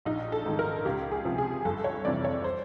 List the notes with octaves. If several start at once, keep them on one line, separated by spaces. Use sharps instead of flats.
A#1 D#4
A4
G#2 D#3
A#4
C#2 G4
G#4
C3 F3
G#4
G1 A4
C#5
F2 C3 E3 D5
C#5
C5